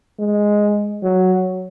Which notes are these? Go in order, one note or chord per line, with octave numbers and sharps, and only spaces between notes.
G#3
F#3